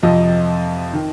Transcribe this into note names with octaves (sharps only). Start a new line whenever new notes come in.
F2 C3 F3 D#5
D#3